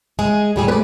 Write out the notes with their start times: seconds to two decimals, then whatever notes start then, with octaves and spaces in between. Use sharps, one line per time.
0.19 G#3 G#4
0.56 A2 G3 G#4
0.68 A3 B4 D5